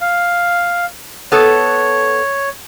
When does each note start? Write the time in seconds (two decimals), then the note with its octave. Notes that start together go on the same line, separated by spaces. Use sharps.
0.01 F5
1.32 B3 A4 C#5